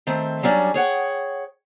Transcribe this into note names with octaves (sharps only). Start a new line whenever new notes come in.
D#3 A3 C4
F#3 G3 C#4 D4
G#4 C#5 F#5 G5